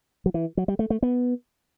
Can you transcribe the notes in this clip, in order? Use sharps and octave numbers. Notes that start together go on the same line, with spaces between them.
F#3
E3
F#3
G3
A3
A3
B3